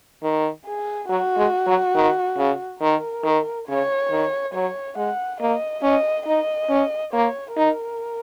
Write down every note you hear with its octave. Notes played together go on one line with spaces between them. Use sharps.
D#3
G#4
F#3 F#4
G#3
F#3
D#3
C#3
D#3 A#4
D#3
C#3 C#5
D#3
F#3 C#5
G#3 F#5
A#3 D#5
C#4 D#5
D#4 D#5
C#4
A#3 C#5
D#4 A#4